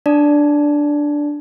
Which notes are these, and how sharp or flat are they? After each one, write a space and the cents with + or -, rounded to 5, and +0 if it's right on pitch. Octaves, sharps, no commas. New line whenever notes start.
D4 +0 D5 -10 A5 -5